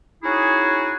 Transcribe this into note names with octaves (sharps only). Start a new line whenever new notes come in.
C#4 D#4 E4 F#4 G#4